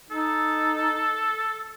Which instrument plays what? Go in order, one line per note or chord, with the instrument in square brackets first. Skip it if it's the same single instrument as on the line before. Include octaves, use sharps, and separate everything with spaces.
[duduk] D#4 [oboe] A4